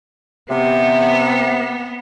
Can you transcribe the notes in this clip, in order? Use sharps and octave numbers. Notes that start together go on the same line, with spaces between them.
C3 B3